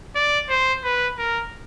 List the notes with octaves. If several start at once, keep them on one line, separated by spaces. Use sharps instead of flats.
D5
C5
B4
A#4